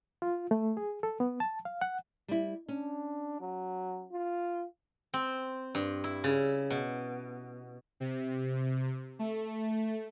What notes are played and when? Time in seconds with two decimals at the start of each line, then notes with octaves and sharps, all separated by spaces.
0.22 F4
0.51 A3
0.77 G#4
1.03 A4
1.20 B3
1.40 A5
1.65 F5
1.81 F#5
2.28 G3 E4
2.68 C#4 D4
3.40 F#3
4.12 F4
5.14 C4
5.75 G2
6.04 E4
6.24 C#3
6.70 B2
8.00 C3
9.19 A3